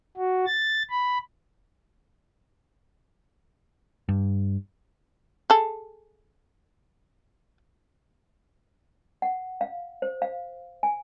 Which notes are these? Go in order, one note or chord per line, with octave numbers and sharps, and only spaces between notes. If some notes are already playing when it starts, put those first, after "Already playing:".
F#4
A6
B5
G2
G#4 A4
F#5
F5
C5
F5
G#5